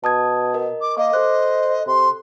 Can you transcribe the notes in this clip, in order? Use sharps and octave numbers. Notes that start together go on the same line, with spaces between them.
B2 A5 D#6 G#6
A#4 D#5
D6
A#3 D#5 D6
A4 C5 F#6
C3 C6